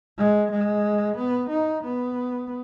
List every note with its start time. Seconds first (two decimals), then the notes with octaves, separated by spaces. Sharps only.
0.18 G#3
0.51 G#3
1.17 B3
1.49 D#4
1.83 B3